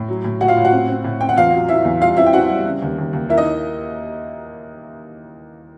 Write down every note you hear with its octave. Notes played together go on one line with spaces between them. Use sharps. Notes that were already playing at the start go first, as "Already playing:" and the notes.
Already playing: A2
F#3
A2
A2 F#4 F#5
F4 F5
A2
F#4 F#5
C4
C4
A2
C4 G5
F#5
E2 F4 F5
F#3
F#3 E4 E5
E2
G3 F4 F5
C4 E4 E5
G5
C4 F#4 F#5
G3
C#3
D#2
D#2
D#2
A#3 E4 E5
D#4 D#5